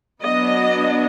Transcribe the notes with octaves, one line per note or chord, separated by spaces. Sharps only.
F#3 B3 D4 D#5